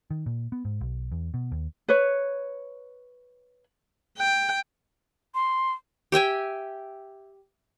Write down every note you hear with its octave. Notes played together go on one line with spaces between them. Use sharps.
D#3
A#2
B3
G#2
B1
E2
B2
D#2
B4 C#5
G5
C6
G4 E5 G5 G#5